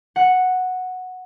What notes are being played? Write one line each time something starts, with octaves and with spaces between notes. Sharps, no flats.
F#5